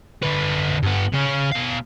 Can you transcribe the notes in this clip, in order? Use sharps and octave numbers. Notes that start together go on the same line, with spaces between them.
D3 B4
G2 B3
C#3 C#4
B2 F5